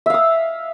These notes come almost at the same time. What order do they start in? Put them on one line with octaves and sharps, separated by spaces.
E5 F5 D#6